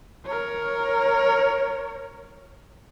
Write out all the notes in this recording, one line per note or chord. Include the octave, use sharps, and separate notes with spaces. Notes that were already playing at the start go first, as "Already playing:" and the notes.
A#4 C#5